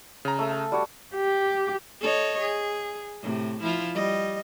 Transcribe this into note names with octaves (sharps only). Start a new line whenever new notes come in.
C#3 A#5
A3 E5
A5
G3 F#4 C#5
G4
A4 C#5 D#5
G#4
A2 C3
F3 E4 F4
G3 D#5